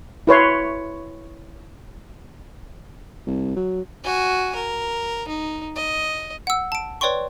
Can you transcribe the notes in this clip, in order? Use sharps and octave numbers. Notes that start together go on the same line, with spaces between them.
E4 B4 C#5 C6
C2
F#3
F#4 G#5
A#4
D#4
D#5
F#5 E6
A5 D7
B4 C#5 D5 G5 C6 C#6